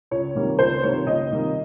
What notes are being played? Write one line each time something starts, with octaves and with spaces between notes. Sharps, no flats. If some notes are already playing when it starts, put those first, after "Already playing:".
C#2 C#5
C3 D#3 G3 A#3
C#2 C5
C3 D#3 G3 A#3 C#5
C#2 D#5
C3 D#3 G3 A#3